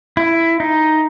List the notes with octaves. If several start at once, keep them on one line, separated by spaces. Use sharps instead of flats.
E4
D#4